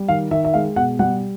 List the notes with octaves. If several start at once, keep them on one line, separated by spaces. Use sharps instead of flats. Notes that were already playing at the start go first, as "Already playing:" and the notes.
Already playing: G3
D#3 F5
D#3 E5
E5
G#3 F5
B2 F#5
G3 F#5